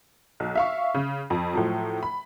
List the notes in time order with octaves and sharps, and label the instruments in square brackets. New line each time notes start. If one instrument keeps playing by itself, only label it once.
[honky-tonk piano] B1
E5 F5 C#6
C#3
F2
A2 F3 F#3
B5